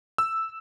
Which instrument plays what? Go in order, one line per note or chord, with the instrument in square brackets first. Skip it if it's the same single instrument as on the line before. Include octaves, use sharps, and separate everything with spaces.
[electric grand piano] E6